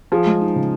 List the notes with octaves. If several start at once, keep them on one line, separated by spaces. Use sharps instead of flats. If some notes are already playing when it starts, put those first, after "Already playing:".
F3 G#4
G#3
D#4
C#3